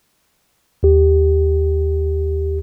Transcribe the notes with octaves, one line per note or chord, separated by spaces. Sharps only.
D#2 G4